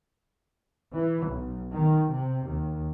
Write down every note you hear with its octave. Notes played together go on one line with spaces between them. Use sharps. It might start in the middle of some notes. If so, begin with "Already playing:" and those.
E3
B1
D#3
C3
D#2